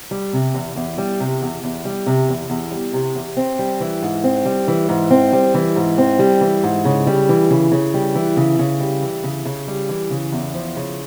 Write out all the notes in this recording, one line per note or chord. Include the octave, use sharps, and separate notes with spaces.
G3
C3
E2
E2
G3
C3
E2
E2
G3
C3
E2
E2
G3
C3
E2
C4
G3
E3
G#2
C4
G3
E3
G#2
C4
G3
E3
G#2
C4
G3
E3
G#2
C#3
G3
E3
C#3
C#3
G3
E3
C#3
C#3
G3
E3
C#3
C#3
G3
E3
C#3
E2
F3
C#3